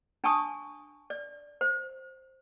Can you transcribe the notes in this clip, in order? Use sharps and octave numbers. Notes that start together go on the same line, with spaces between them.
D4 G#5 A5 C#6 D#6
D5
C5